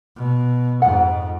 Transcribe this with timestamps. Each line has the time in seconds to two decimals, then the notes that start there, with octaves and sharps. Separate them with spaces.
0.16 B2
0.82 F2 G#2 F#5